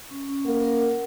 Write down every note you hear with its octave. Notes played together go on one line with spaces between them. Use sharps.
C#4
C#4
A#3 F#5
A#4
F#5